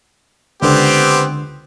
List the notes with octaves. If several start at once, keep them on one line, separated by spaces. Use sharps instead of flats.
C#2 D3 B3 C4 G4